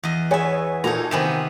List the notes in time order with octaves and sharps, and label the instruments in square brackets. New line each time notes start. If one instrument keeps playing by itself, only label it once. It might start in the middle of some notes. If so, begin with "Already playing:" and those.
[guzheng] E2 D#5
[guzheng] B3 E5 [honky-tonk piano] G#4 C#5 G#5
[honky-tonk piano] A#2 F#4 A4 [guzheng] D#4 C#5 A#5
[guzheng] C3 D#3 B3 [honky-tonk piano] C4 G#5 E7